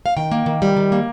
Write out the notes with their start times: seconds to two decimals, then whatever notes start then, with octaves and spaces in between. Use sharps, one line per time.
0.06 F5
0.17 D#3 G5
0.32 A#3
0.46 D#3
0.62 G3
0.77 D#3
0.92 A#3